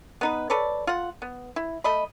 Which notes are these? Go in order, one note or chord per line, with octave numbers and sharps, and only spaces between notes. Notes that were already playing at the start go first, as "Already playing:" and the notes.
B3 D#4 B4
A4 B4 C#5 D5
F4 F#5
B3
E4
A3 D#5 B5